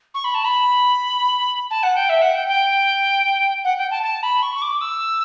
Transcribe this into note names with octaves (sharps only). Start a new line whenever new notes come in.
C#6
B5
A5
B5
A5
F#5
G5
E5
F#5
G5
G5
F#5
G5
A5
A5
B5
C#6
C#6
D6
E6